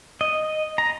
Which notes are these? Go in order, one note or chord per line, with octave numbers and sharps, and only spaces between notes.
D#5
A#5